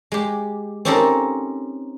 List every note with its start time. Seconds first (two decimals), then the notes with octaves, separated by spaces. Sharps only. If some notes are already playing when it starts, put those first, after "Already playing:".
0.12 G#3 G4
0.85 C4 C#4 D#4 G4 A4 A#4